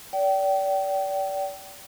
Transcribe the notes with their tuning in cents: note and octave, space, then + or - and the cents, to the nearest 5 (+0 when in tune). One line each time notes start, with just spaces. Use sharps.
D5 -35 G5 -30